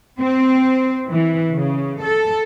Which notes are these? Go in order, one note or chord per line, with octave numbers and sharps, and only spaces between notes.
C4
E3
C#3
A4